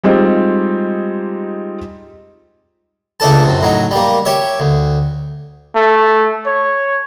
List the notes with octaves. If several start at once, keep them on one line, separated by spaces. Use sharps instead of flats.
G3 G#3 C4 D#4 F4 G4
C#2 A3 D4 A4 A5
F#2 C3
A2 F#3 D#4
G3 A#3
G4 C#5 E5
D2
A3
C#5